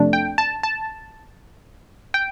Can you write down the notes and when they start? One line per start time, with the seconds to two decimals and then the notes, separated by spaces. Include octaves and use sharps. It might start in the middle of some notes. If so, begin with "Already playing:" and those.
Already playing: F2 C3 A3 D4
0.13 G5
0.38 A5
0.63 A5
2.14 G5